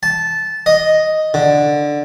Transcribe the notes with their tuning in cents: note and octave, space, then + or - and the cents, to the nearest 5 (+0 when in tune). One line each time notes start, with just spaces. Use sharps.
A5 -10
D#5 +0
D3 +5